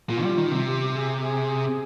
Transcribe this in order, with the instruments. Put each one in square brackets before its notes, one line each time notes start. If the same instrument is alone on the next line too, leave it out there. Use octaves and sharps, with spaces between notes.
[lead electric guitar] A#2 [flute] F4
[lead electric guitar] G3
D#3
C3
[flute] G4
G#4
G#4